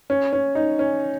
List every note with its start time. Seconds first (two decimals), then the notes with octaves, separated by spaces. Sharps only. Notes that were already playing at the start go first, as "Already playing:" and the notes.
0.10 C#4
0.33 C#4
0.55 D#4
0.79 C#4